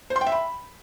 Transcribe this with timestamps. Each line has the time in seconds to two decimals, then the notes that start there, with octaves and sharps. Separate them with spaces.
0.10 C5
0.16 C6
0.21 G5
0.27 E5
0.32 B5